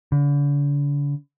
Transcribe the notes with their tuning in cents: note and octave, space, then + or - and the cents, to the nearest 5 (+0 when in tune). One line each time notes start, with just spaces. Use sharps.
D3 -40